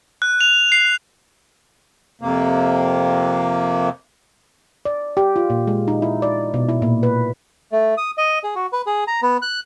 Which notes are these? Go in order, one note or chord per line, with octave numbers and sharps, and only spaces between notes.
F#6
F7
C7
F2 C3 A#3
D5
G4
F4
A#2
G#3
D#4
E4
D5
B2
E4
A#2
B4
A3
D#6
D#5
G#4
F#4
B4
G#4
A#5
B3
F#6